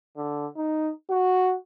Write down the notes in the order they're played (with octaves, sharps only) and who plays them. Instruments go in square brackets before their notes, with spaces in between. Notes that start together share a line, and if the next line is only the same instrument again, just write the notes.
[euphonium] D3
D#4
F#4